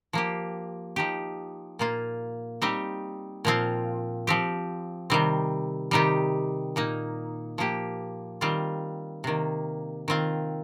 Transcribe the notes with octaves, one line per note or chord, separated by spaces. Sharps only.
F3 A#3 G4
F3 D#4 G4
A#2 A#3 F4
G3 C4 D#4 G4
A#2 F3 C4 F4
F3 C4 G4
C3 D#3 G3 C4
C3 D#3 G3 D#4 G4
A#2 A#3 D#4
F3 A#3 G4
D#3 G3 C4 F4
C3 D#3 A#3
D#3 C4 F4